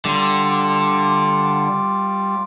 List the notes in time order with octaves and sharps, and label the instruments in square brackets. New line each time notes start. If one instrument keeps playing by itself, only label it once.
[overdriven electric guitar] D3 [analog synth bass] G3 [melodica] F4 D6